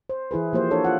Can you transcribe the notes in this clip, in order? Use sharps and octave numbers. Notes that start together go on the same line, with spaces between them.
C5
E3 E4 G#4 B4
F3 A#3 G4 C5
D4 A4 C#5
F4 F#5